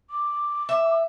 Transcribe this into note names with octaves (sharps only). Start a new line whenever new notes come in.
D6
E5